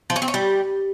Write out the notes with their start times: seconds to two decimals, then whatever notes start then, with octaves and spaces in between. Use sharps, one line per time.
0.10 F3
0.16 C#4
0.22 C4
0.28 C#4
0.34 G3